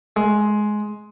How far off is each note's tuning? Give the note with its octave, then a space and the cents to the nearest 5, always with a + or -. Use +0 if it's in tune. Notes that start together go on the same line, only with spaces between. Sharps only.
G#3 +15